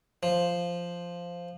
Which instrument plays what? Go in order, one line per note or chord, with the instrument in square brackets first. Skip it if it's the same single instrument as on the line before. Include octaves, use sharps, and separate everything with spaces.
[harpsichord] F3